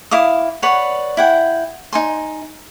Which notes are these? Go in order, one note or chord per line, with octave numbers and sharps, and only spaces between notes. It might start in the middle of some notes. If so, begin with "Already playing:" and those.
E4 F5 D6 D#6
B4 C#5 D5 F#5
E4 F#5 G5
D#4 G#5 C6